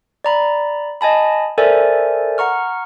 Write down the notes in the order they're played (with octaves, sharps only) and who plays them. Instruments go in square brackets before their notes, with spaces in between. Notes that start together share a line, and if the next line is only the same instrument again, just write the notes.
[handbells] D5 A#5 B5
D#5 G#5 A5 B5
A4 A#4 C5 D5 E5 G#5
F#5 A#5 C#6 F6